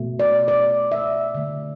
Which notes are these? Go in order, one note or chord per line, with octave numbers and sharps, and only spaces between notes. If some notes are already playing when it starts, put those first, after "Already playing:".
Already playing: B2 A3
D5
D5
E5
D3 A3